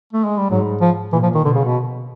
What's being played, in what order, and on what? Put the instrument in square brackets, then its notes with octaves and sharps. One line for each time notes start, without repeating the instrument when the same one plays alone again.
[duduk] A3
G#3
G3
[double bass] G#2 [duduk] F#3
[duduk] F3
[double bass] A#2 [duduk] E3
[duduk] F3
D#3
[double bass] B2 [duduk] D3
[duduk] C#3
B2